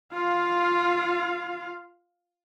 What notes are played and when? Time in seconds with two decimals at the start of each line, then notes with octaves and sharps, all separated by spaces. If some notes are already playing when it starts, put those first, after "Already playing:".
0.13 F4 F5